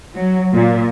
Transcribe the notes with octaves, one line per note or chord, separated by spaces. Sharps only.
F#3
A#2